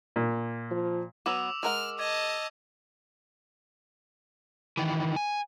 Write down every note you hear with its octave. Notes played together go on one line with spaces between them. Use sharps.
A#2
F3
F#3 B3 B4 D6 E6 F7
G#3 A#4 F#5 F6
D#5 A5 D6 G#6
D#3 E3
G#5